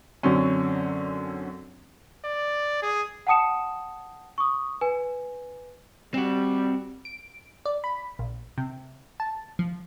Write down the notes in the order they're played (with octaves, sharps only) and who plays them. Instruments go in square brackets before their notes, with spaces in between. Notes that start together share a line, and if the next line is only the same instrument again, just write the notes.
[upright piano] F#2 D3 F#3 C4 C#4
[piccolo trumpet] D5
G#4
[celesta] F#5 G5 A5 D#6 C#7 E7
C#6 D#6
B4 G#5
[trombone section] G3 [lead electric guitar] C4 F#4
[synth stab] D7
D5
B5
A#1
C3
A5
F3